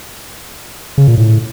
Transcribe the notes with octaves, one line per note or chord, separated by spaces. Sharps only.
C#3
A#2
A2